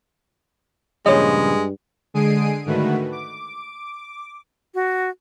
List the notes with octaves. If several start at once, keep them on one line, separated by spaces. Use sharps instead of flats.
G2 A#2 C#3 F3 G#3 C#5 D#5
D3 G#3 G#4 C7 D7 D#7
G#2 D3 D#3 A3 F#4 B4
D6
F#4